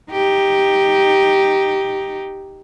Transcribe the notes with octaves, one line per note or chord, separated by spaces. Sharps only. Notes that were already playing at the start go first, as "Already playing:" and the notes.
D#4 G4